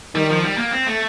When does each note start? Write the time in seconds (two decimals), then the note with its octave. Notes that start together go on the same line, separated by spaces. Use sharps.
0.15 D#3 G3
0.29 F3
0.44 G3
0.57 A#3
0.71 C4
0.87 A3